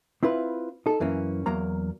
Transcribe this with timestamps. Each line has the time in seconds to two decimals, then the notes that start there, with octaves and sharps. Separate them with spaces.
0.23 C4 E4 F4 B4
0.86 D#4 A4
1.00 F#2 E3 A#3 C#4
1.46 E2 F#3 A#3 A#5